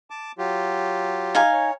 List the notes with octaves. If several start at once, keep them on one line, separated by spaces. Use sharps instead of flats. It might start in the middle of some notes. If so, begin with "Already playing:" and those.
A5 D6
F#3 F4 G4
D#4 F5 G#5
C#5